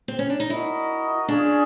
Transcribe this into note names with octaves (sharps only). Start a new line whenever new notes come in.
C4
C#4
D4
D#4
E4 F#4 A#4 D#5
C#4 D4 F4 G#4